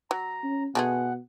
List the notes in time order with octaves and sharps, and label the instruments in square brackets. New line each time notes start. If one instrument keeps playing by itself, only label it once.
[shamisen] F#3 [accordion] A#5
[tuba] C#4
[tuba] B2 [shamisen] G#3 A3 G#4 [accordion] B3 F#5